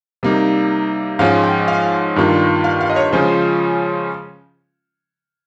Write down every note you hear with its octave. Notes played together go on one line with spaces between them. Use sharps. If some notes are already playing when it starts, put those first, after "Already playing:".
C3 G3 A#3 D#4
G#2 F3 G#3 C#4 F4 F5
G5
F5
G2 D#3 A#3 F4
F5
F5
D#5
C#5
C#3 F3 G#3 C#4 F4 C5